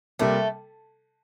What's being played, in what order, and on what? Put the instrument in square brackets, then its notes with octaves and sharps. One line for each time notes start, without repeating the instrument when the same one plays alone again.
[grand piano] C3 G3 A#3 [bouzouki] A3